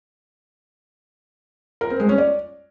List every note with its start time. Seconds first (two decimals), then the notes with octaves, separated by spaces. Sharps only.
1.81 A#4
1.90 C4
2.00 G#3
2.09 C#4
2.18 D5